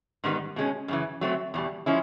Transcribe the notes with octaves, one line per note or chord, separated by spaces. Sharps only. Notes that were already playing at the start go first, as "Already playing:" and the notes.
G#2 D#3 G3 B3 D#4
B2 G#3 C#4
F#2 C#3 E3
F#3 A3 C4
E2 B2 G3
F3 G#3 C#4 E4